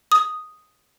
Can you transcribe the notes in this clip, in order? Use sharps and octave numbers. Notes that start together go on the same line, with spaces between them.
D#6